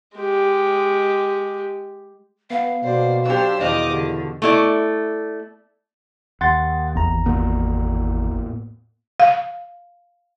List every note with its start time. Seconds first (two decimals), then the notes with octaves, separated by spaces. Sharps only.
0.15 G#3 G4
2.50 B3 F5
2.83 B2 A#3 C5 D5
3.25 F#3 D4 G4 C5 E6
3.60 E2 B2 D#3 C5 D#5 F5 D6
3.89 D3 G4
4.42 A3 E4 D5
6.41 D#2 F#5 C6 A6
6.95 G#1 E2 A#5
7.26 A2 A#3 B3
9.20 F5